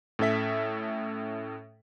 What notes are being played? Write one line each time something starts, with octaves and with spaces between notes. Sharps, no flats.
A2 C#4 A4 E5 B6